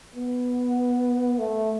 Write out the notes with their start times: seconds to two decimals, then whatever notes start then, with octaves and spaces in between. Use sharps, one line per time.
0.15 B3
1.38 A3